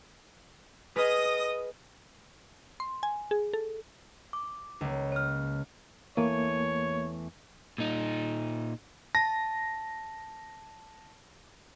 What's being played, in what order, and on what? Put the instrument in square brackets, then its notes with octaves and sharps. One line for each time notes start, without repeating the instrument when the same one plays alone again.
[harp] G#4 B4 F6 [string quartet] D#5 D#6 A#6
[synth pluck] C6
G#5
G#4
A4
[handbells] D6
[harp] C#2 A#3
[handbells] C#5 F6
[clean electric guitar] E2 E3 A3 [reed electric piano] A#3 [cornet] C#5
[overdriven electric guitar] A#2 D#4
[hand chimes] A5 [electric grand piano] A#6